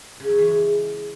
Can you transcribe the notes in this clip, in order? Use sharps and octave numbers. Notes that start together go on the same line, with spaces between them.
C#3
F#3
E3
G#3